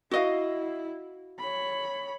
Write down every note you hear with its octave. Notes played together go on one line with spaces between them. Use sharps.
E4 F#4 D#5 F5
C#5 B5